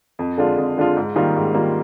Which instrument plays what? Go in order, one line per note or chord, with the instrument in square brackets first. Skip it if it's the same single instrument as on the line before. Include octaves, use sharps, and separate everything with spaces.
[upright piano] F2
D3 G#3 D4 F4
F2
D3 G#3 D4 F4
G#2
D#3 G3 A#3 F4
G#2
D#3 G3 A#3 F4